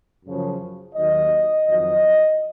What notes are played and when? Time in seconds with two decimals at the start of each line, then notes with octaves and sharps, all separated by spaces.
0.25 F#2 C#3 F3
0.95 D#2 D#3 F#3 D#5
1.67 F2 D#3 F#3 D#5